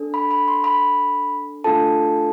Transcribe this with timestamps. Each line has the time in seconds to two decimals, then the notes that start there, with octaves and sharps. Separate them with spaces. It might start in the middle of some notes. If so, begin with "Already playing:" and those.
Already playing: D4 A4
0.14 B5
0.31 B5
0.48 C6
0.64 B5
1.64 A3 D4 F4 A4 A5